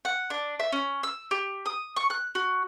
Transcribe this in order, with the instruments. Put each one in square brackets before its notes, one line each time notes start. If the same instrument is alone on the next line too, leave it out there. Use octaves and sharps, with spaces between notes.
[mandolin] F#5
D4
E5
C#4
E6
G4
D#6
C#6
F#6
F#4